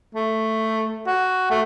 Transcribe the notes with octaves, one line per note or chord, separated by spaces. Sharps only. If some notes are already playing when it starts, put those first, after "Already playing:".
A3
F#4
A3